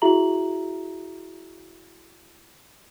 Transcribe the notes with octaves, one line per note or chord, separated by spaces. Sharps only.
E4 F#4 G#4 E5 A#5 F#7